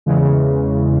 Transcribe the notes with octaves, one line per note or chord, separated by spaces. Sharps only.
E2 C#3 E3 G#3